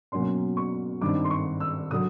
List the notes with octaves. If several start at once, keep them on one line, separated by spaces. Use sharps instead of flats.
B2 F#3 A#3 C#4 C6
C#6
G2 D#3 G3 C4 D6
C6
C#6
E6
D3 F#3 D#6